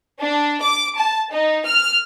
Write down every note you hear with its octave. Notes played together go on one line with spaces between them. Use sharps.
D4
D6
A5
D#4
F6